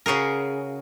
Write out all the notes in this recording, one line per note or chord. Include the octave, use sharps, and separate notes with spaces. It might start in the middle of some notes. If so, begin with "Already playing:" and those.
C#3 F#4 G#4 A#4